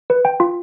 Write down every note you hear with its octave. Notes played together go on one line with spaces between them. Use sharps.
B4
G5
F4